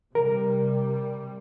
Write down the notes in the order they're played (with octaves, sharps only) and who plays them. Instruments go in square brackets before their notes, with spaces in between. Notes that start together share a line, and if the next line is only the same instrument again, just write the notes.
[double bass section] C3 G3 [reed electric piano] A#4